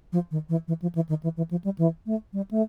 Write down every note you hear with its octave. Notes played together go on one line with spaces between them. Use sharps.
F3
D#3
E3
E3
F3
E3
D#3
E3
E3
F3
G3
E3
A3
G3
A3